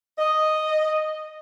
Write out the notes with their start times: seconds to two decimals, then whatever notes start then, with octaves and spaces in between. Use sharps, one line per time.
0.18 D#5